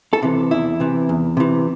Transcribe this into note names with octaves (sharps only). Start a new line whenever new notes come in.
A4
C3 E3
E2 E4
C3 E3
E2
C3 E3